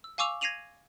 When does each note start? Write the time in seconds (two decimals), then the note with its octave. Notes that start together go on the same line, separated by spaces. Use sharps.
0.04 E6
0.18 F5 G#5 C#6 D6 E6 F7
0.41 G#6 A#6 C7 D#7 F7 F#7